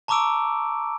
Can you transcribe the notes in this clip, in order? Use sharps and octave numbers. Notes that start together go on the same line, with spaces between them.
A5 A#5 C#6 D6 E6 D7